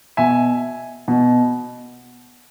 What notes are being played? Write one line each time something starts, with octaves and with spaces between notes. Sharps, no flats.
B2 E5 G#5
B2